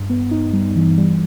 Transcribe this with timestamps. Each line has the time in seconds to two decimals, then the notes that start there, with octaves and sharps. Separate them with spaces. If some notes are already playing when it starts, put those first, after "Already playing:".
Already playing: G2
0.10 B3
0.31 D#4
0.53 G3
0.76 E3
0.98 G3